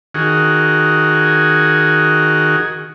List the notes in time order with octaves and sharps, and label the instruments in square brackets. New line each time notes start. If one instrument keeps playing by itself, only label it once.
[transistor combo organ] D#3 F#4 G#4